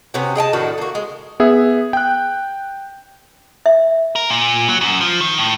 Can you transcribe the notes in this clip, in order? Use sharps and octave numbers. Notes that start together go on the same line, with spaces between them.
C3 B3 C#4 F#4
G#4 D#5 G5 A5
A2 D#3 D4 F#4
A#3 F#4
G#3
B3 G#4 E5
G5 F#6
E5
A#4
A#2
F#3
F#2
F3
D#3
A2